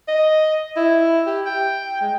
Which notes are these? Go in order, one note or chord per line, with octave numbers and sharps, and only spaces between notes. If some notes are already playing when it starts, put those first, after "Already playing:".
D#5
E4
G4
G5
G#3